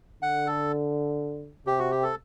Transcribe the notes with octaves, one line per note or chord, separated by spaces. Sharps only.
D3 F#5
A4
C3 G4
F#4
G4
A4